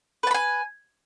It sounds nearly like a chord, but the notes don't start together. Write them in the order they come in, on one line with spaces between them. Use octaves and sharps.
B4 A5 B5 G#5